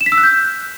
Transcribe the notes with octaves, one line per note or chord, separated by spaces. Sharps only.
E7
B6
E6
F#6
G6